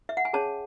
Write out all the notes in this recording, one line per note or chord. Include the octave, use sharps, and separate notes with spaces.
E5
F#5
G#5
C#4 G#4 C#5 A5